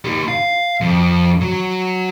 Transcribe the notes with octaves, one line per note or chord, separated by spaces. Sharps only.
D#4 G4
F5
F2
F#3